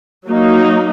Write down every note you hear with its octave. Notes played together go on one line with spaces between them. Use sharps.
F#3 A#3 D#4